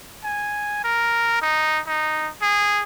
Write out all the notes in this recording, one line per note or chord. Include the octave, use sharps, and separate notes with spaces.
G#5
A#4
D#4
D#4
G#4